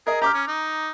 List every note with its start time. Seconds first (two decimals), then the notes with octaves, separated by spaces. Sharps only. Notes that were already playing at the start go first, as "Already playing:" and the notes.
0.07 G#4 A#4 D#5
0.22 G4 A#5 D6 F6
0.34 C#4
0.48 D#4